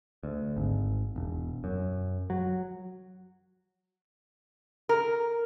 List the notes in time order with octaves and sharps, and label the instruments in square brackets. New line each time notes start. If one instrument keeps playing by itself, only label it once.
[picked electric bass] D2
G#1
E1
F#2
F#3
[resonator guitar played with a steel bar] A#4